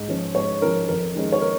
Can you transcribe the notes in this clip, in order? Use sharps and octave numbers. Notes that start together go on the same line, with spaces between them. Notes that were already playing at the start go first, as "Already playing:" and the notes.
Already playing: G#2
F3 C#4
G#2 C#5
F3 C#4 A#4
F2 A#4
D#3 G#3 C#4
C#5
A#4